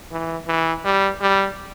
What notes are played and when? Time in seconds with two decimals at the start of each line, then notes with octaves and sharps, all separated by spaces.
0.11 E3
0.47 E3
0.85 G3
1.21 G3